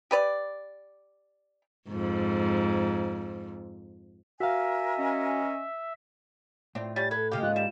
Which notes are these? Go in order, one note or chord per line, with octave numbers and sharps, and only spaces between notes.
G4 B4 D5
F2 G#2
F#4 A#4 E5 F5 G#5
C#4 D#5
A2 C4 D4 F4
G3 C#4 A6
A4 B4 G#6
D#2 C#3 G#3 G4 F5
G#2 F4 F#6
G3 E7